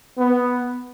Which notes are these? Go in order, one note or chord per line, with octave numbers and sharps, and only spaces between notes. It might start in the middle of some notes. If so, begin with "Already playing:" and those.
B3